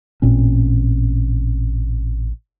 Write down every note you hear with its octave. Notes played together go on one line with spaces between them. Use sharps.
A1 A#2 C4 C#4